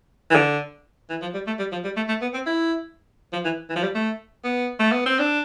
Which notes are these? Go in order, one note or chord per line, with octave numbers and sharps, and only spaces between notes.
E3
D3
E3
F3
G3
A3
G3
F3
G3
A3
A3
B3
C4
E4
F3
E3
E3
F3
G3
A3
B3
A3
B3
C4
D4